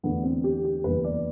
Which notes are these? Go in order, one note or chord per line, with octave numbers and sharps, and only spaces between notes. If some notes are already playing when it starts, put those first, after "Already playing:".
E2 D3 A3 B3
C4
G4
G4
F#1 E2 D3 G3 B4
D5